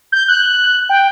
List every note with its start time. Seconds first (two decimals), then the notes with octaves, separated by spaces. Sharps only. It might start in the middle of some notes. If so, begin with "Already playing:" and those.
0.12 G6
0.28 F#6
0.89 G5